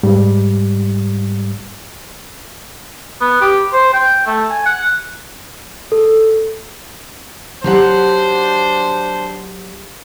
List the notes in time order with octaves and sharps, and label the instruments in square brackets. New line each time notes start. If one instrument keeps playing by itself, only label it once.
[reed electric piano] G#2 G3
[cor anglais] B3
G4
C5
G5
A3
G#5
F#5
[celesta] A4
[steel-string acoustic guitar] F#3 G4 F#5 [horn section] D4 C5